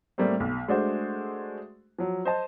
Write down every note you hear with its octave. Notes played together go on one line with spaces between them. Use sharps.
A2 G3 A3 A#3 C4
B1
G#3 A3 D4 F#4 C5
F3 F#3
C5 D#5 A5